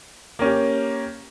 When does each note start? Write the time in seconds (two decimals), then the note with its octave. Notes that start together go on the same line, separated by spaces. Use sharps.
0.39 A#3 C#4 G4